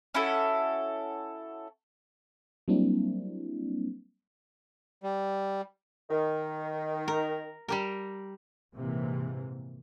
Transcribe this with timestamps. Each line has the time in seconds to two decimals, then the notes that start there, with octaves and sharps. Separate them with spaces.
0.14 C#4 E4 F#4 A4
2.68 F#3 G3 A#3 C4 D4 E4
5.03 G3
6.10 D#3
7.08 A#4
7.68 G3 G4 A#4
8.74 A#1 G#2 C3 E3 A#3